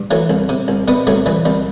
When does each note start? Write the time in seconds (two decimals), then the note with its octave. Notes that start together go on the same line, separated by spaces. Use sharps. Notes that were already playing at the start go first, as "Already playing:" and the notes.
Already playing: G2
0.11 E3 F#3 A3
0.30 C2
0.49 C3
0.68 C2
0.88 C3 G3 B3
1.07 C2 F#3 A3
1.26 E3 G3
1.45 C2 G3